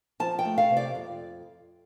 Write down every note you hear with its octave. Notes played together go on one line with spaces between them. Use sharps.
F3 A5
G5
A3
F5
C3
D5
F2